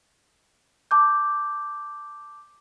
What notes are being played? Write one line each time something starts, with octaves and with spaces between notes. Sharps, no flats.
A5 D6 G6